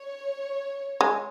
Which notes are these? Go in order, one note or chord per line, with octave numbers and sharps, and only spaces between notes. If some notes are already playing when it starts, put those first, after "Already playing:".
Already playing: C#5
G#3